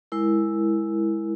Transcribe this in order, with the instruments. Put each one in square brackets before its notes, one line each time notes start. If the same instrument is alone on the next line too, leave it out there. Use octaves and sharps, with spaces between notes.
[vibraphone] G#3 E4 A#4